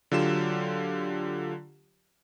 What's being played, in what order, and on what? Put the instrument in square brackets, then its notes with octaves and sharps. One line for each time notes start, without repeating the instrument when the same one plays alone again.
[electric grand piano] D3 F#3 F4 G4 E7